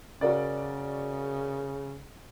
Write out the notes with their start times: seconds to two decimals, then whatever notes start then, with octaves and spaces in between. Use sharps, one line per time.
0.21 C#3 F#4 A#4 D5